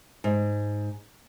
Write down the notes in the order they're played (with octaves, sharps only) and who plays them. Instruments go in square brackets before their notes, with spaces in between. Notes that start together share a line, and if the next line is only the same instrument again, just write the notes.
[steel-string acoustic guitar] G#2